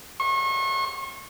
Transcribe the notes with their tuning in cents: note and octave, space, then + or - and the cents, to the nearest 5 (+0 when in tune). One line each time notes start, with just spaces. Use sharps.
C#6 -40